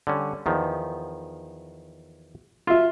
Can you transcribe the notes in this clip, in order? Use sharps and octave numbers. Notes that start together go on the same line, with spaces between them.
D3 G3 C#4
E2 D#3 F3
F4 E5